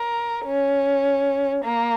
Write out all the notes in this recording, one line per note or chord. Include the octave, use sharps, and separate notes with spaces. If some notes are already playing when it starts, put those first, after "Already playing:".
Already playing: A#4
C#4
A#3